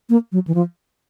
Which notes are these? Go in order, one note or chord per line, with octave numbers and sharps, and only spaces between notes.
A#3
F#3
E3
F3